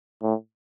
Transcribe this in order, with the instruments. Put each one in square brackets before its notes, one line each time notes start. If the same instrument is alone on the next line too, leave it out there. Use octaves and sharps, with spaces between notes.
[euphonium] A2